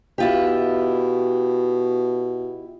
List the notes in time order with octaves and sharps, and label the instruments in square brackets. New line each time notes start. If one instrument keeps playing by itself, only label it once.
[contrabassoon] B2 [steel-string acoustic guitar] E4 F4 G4